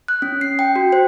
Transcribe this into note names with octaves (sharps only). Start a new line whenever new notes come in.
F#6
C#4
C7
G5
F#4
C5